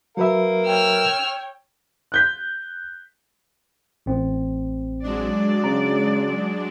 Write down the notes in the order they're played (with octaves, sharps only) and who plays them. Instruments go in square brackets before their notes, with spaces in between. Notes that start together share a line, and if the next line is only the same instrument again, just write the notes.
[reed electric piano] F#3 B4 E5 [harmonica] A#4 F5
[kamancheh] C#5 G5 [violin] E6 F6
[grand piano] F#6 G6 B6
[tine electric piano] A1 C4
[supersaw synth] F#3 G#3 D4 [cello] D5
[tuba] C#3 [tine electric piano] A#5